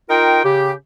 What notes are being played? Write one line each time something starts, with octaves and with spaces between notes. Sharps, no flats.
D#4 F4 A#4 G5
C#3 G4